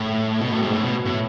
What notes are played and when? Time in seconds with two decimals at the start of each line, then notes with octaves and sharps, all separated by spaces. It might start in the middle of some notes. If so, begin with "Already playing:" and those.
Already playing: A2
0.41 B2
0.51 A2
0.62 G#2
0.73 A2
0.83 B2
1.05 A2